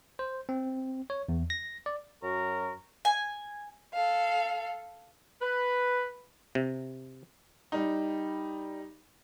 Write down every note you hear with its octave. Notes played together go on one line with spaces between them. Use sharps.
C5
C4
C#5
E2
A#6
D5
F#2 F#4 A#4 A#5 C#6
G#5
A4 F5
B4
C3
G3 D#4